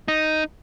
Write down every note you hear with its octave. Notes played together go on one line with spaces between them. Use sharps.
D#4